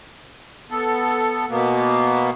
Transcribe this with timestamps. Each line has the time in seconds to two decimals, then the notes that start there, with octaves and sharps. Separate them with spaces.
0.70 B3 A4
1.49 B2 A#3 B3